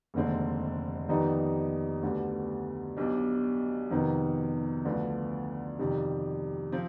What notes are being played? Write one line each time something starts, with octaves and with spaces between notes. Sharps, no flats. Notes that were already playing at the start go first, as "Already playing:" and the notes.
F1 D#2 D3 G#3 C4
F2 D#3 G3 B3 D#4
D2 D3 G3 B3
B1 B2 G3 D4
F2 C3 D#3 B3
D2 D3 F3 B3
F2 C3 D#3 G3
F3 C4